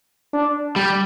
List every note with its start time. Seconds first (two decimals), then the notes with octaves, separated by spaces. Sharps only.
0.33 D4
0.76 G3